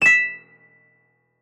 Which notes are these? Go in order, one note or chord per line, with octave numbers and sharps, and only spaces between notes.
B6 E7